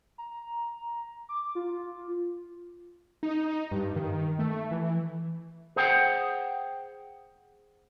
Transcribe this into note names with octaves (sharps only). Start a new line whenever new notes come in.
A#5
D6
F4
D#4
G2
D#3
A3
E3
G#4 C5 F#5 G5